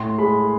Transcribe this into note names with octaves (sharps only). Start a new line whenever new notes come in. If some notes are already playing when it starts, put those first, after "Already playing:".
Already playing: A2 C6
G#3 B5